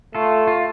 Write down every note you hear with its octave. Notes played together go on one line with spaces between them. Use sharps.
A3 F4 A4
F4